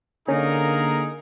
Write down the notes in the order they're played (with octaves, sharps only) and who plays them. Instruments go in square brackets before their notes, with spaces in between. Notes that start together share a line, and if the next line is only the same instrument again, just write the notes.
[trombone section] D3 A#3 [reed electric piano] C#4 [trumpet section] D#4 G#4 A#4